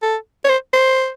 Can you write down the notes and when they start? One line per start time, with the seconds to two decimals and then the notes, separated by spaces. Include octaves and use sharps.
0.02 A4
0.45 C#5
0.49 C5
0.73 C5